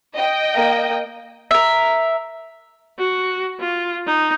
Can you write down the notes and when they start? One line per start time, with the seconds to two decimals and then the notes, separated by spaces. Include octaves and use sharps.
0.14 D#5 G5
0.54 A#3
1.51 A#4 E5
2.99 F#4
3.60 F4
4.07 D#4